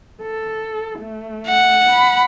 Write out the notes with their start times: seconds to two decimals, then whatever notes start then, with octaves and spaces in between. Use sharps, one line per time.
0.22 A4
0.99 A3
1.47 F#5
1.89 B5